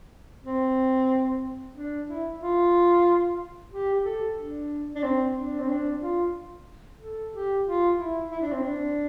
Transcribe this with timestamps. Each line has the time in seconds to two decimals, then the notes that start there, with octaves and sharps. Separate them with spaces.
0.44 C4
1.75 D4
2.07 E4
2.41 F4
3.72 G4
3.94 G4
4.05 A4
4.37 D4
4.95 D4
5.03 C4
5.36 D4
5.59 C4
5.69 D4
6.01 F4
7.00 A4
7.33 G4
7.65 F4
7.98 E4
8.31 E4
8.41 D4
8.52 C4
8.63 D4